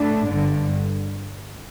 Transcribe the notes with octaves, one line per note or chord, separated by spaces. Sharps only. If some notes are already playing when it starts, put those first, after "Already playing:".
Already playing: A2 A3 D4
G1 G2 D3